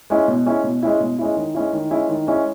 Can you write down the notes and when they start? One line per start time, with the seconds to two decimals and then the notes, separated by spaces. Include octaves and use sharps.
0.10 G#3 C#4 E4
0.28 B2
0.46 G#3 C#4 E4
0.64 B2
0.83 G#3 C#4 E4
1.00 B2
1.19 G#3 C#4 E4
1.37 D#3
1.54 G#3 C#4 E4
1.73 D#3
1.90 G#3 C#4 E4
2.09 D#3
2.27 G#3 C#4 E4